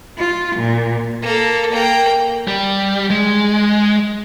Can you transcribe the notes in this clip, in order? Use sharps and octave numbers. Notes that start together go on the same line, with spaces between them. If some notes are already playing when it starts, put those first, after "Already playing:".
F4
A#2
A#3 A4
A#3 G5
G3
G#3